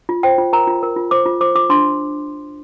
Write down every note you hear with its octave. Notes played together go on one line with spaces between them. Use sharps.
F4
C5 G5
F4
A#4 A#5
F4
A#4
F4
C5 D6
F4
C5 D6
F4 D6
D4 C6